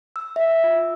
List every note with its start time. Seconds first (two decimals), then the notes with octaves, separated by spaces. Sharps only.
0.16 E6
0.36 E5
0.51 E6
0.64 F4